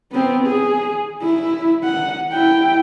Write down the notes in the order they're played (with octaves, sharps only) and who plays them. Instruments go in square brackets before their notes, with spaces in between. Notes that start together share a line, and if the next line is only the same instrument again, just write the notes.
[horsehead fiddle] B3 C4
G#4
E4
F#5
E4 G5